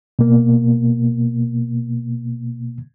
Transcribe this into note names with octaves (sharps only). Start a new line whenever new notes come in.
B2 A#3